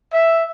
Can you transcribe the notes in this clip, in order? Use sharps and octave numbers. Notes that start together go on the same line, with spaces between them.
E5